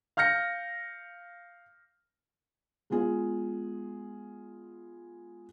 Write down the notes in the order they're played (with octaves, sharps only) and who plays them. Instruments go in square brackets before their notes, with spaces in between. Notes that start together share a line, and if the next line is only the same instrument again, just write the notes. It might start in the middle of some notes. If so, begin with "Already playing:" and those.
[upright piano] F5 F6 G6 A#6 C#7
[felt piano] G#3 B3 F4 G#4